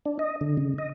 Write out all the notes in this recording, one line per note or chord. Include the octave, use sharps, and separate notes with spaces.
D4
D#5
D3
C#3
D#5